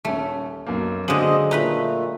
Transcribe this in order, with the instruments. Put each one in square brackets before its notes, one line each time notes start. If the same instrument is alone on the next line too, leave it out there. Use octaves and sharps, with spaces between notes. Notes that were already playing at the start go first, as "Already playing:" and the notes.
[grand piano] D#1 C#4 [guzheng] A3
[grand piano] B1 F#2 A#3
[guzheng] D3 G#3 [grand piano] F#3 F5 F#7 [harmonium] C5 D#5
[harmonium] A#2 A3 [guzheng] D#4 B4 B5